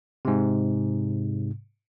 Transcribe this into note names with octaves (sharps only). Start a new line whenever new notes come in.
G#2 C3